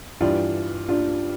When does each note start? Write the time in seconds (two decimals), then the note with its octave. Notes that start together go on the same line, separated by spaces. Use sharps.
0.20 G2 E3 G3 D4 F4
0.88 D4 F4